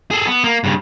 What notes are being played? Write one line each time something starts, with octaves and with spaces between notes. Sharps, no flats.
G#4 A4
B3
A#3
G2 C#3